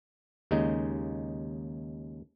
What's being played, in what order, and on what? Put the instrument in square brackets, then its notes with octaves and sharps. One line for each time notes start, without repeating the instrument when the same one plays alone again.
[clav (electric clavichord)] D#2 C#3 G#3 D#4